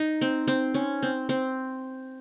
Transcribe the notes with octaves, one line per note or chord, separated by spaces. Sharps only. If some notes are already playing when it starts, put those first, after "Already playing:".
Already playing: D#4
C4
C4
C#4
C4
C4